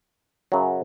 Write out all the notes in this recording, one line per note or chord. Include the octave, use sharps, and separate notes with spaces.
F#2 C#3 F#3